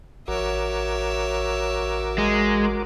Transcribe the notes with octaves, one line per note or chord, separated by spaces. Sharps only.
A1 F#4 A#4 C#5 E5 D6
G#3